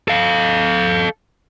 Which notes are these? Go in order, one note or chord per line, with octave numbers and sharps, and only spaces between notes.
A4 F5